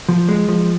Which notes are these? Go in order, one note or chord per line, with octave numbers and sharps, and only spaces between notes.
F3
G#3
F3